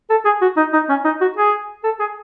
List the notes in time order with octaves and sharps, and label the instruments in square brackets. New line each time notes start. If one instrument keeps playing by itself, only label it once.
[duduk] A4
G#4
F#4
D#4
D#4
C#4
D#4
F#4
G#4
A4
G#4